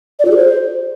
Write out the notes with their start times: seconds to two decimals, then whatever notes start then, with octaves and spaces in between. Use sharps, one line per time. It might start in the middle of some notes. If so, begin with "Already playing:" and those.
0.19 D5
0.25 F4
0.30 G#4
0.36 C5